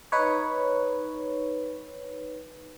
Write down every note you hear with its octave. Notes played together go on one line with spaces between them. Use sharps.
D#4 B4 C#5